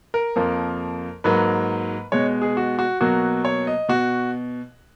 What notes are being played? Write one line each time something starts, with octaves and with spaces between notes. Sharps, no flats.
A#4
F2 F3 A#3
G#2 F#3 A#3 B4
B2 G#3 C#5
G#4
F#4
F#4
B2 F#3 A#3 F#4
C#5
D#5
B2 F#4